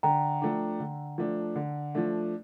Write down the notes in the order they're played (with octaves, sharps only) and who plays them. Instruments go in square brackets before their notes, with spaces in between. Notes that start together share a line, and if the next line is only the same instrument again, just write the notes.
[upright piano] D3 [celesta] G5 A#5
[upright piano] F3 A3 D4
D3
F3 A3 D4
D3
F3 A3 D4